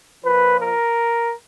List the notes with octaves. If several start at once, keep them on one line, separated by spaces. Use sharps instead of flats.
A#2 F3 B4
A#4